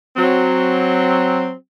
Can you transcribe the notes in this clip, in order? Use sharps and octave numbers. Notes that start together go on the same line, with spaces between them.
F#3 C4